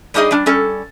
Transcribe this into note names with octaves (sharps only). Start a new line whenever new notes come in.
G3 D4 D#4 G#4 D#5
G3 D4
G3 C#4 A4